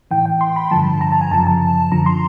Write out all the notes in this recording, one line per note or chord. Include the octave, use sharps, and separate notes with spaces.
A2 E3 G5
G5
C6
B5
G2 D3 F3 A5
A#5
A5
G#5
F#2 C#3 F3 A5
A5
F#2 D3 F3 A#5
C6